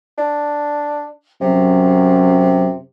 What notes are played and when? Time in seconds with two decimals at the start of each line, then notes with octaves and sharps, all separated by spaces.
0.18 D4
1.41 F#2 C3